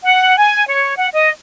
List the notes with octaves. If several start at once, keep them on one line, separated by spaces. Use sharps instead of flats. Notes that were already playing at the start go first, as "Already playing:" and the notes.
F#5
G#5
C#5
F#5
D#5